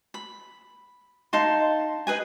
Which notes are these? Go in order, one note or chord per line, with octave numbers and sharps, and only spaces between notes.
B5
D#4 F5 A5 C6
D#4 G#4 B4 G#5